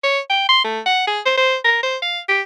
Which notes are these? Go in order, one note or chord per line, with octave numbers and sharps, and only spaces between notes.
C#5
G5
C6
A3
F#5
G#4
C5
C5
A#4
C5
F5
G4